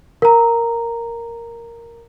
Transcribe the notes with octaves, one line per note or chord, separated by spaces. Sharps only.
A#4 A#5